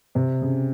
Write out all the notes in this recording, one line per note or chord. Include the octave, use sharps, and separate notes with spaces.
C3
C#3